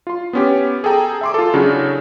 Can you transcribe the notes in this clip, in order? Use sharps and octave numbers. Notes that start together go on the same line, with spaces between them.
F4 C6
B3 C#4 G4
G#4 A4 G5 A#5
E5 C6 D6
F4 A4
C#3 F#3 D4 E4 F#4 G#4